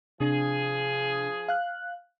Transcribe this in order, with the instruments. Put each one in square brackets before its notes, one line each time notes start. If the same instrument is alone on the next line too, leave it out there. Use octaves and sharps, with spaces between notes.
[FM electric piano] C3 D4 [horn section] F3 G#4
[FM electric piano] F5 F#6